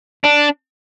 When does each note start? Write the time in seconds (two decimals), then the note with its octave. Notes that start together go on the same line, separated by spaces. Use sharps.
0.25 D4